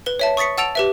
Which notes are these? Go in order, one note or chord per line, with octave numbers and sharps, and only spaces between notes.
B4 G7
C#5 E5 A5
C#6 D#6 A6 B6 C#7
F#5 A5 E6 A6 D7 F7
G4 B4 E5